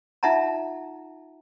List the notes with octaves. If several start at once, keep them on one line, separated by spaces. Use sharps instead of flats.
D#4 F4 E5 F#5 A5 A#5